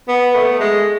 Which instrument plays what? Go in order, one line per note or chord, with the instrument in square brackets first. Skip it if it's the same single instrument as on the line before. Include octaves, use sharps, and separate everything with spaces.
[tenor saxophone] B3
A3
G#3